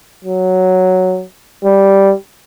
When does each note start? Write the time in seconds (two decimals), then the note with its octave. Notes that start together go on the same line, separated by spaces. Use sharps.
0.25 F#3
1.64 G3